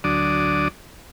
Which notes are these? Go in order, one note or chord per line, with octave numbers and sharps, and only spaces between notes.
D2 F#3 D4 D5 D#6